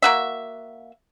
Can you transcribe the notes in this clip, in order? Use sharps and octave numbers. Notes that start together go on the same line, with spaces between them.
A#3 F#4 E5